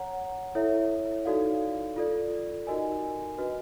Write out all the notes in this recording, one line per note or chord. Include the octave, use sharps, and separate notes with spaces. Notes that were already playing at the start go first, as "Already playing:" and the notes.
Already playing: C#5 F#5 A#5
E4 A4 C#5 E5
D#4 F#4 A4 D5 F5
F4 A4 D5
D#4 F#4 A#4 D#5 G#5
D4 F#4 B4 D#5